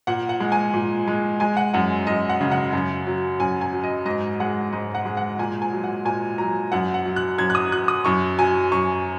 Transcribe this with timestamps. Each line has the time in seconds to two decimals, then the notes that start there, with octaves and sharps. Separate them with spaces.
0.07 A#2 F#5
0.29 F#5
0.40 G#3
0.52 G#5
0.74 A#2
1.08 G#3
1.40 G#3 G#5
1.57 F#5
1.73 F#2 F#5
2.07 F#2 D#5
2.29 F#5
2.41 C#3
2.52 F#5
2.73 F#2
3.07 F#3
3.40 F#2 G#5
3.61 G#5
3.73 F#3
3.83 D#5
4.06 G#2 D#5
4.40 G#3 F#5
4.72 G#2 D#5
4.95 F#5
5.06 G#3
5.17 F#5
5.39 A#2 G#5
5.62 G#5
5.73 F#3
5.84 F#5
6.05 A#2 G#5
6.38 F#3 A#5
6.72 F#2 F#5
6.94 F#5
7.05 F#3
7.16 F#6
7.38 F#2 G#6
7.50 F#6
7.55 D#6
7.71 F#3 F#6
7.88 D#6
8.05 F#2 C#6
8.38 F#3 G#5
8.72 F#2 C#6